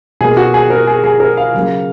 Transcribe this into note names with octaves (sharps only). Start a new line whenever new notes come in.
B2 A#3 G#4
F#4
G#4
A#4
G#4
G#4
A#4
F5
C#3 F#3 A#3